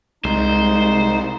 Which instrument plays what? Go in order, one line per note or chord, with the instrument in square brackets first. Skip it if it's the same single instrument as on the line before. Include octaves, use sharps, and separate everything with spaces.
[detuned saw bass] C2 [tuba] G#3 [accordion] D#4 [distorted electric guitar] C5